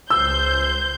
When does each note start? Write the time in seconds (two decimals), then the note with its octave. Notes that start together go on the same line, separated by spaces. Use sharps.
0.10 C#2 C5 E6 G6